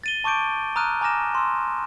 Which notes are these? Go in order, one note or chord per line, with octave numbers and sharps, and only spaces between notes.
A6 D#7 G7
A5 C#6 D6 G6 D7
A#5 D#6 F6 F#6 D#7
G#5 A#5 D6 F6 A#6 E7
C6 E6